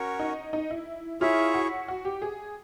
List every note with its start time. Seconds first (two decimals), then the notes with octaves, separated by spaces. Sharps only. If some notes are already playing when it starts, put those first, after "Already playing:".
Already playing: C#4 F#4 A#4 C#5
0.19 D#4
0.53 D#4
0.70 E4
1.21 E4 F4 G#4 C#5 E5
1.54 F#4
1.88 F#4
2.05 G4
2.22 G#4